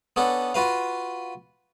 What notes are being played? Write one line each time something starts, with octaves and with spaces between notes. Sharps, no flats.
B3 C#4 D4 A4 F#5
F4 F#4 B4 F5